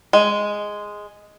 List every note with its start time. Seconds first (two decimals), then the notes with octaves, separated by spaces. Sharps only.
0.13 G#3